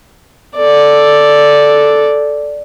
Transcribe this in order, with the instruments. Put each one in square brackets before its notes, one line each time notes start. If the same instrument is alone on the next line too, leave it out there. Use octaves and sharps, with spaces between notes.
[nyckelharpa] A4 D5